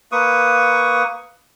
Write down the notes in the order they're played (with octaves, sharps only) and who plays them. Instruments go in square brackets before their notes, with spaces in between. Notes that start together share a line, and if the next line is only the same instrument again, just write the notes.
[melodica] A#3 B4 C#6 D#6